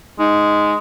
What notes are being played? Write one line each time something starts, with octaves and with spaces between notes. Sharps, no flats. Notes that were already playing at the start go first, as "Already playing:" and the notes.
G#3 D#4